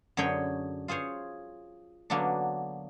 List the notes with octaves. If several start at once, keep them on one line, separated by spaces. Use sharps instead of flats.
F#2 D3 G#4 C#5 G5
F4 G#4 C5 C#5
D3 F#3 A#3 B3 D4